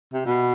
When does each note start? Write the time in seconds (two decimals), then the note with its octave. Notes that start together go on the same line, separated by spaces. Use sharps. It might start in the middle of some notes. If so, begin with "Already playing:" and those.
0.14 C3
0.26 B2